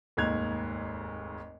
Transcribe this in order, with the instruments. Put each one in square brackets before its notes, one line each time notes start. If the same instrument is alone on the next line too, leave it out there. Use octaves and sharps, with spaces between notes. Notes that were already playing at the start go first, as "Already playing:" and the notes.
[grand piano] F1 D#2 G#2 F#6 G#6 F7